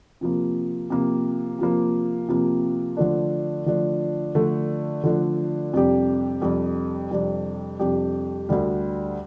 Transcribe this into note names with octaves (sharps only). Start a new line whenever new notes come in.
C3 F3 A#3
C3 F3 A#3
C3 F3 A#3
C3 F3 A#3
D3 F3 A3 D4
D3 F3 A3 D4
D3 F3 A3 D4
D3 F3 A3 D4
F2 C3 G3 D4 G4
F2 C3 G3 D4 G4
F2 C3 G3 D4 G4
F2 C3 G3 D4 G4
D2 D3 G3